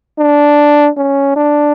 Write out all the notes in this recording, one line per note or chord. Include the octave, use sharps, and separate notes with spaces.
D4
C#4
D4